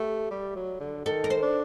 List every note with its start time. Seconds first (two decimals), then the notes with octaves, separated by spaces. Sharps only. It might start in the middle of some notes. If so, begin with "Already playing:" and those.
Already playing: A3 G4
0.31 G3
0.56 F#3
0.80 D3
1.05 D#3 A4
1.24 A#4
1.30 C5
1.43 D4